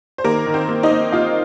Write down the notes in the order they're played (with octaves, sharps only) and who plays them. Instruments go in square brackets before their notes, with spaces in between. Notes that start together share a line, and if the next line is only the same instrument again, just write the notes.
[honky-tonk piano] C5
D#3 A#3 A#4
D#3
C4 C5
A#3
D#4 D#5
A#3
A#3 F4 F5